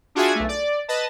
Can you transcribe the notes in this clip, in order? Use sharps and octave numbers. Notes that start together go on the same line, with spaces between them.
D4 F4 F#4 G#4 E5 G#5
B1 A3
D5
B4 D#5 A5